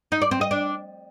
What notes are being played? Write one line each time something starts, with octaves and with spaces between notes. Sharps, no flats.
D#4
D5
C4
D#5
D4